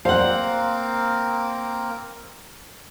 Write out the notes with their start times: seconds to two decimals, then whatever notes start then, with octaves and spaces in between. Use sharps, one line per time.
0.05 A#3 C4 A#4 C5 F5 F#5